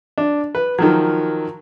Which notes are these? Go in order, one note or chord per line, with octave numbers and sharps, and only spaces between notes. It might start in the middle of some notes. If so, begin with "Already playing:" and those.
D4
B4
D#3 F3 F#3